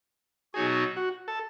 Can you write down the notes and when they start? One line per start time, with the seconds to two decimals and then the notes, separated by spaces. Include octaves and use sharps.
0.54 B2 F#3 B3 D#4 F#4 G#4
0.96 F#4
1.28 A4